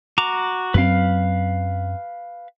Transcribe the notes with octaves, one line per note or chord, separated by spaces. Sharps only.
F#4 A#5 D6
F#2 F#3 C4 B4 F5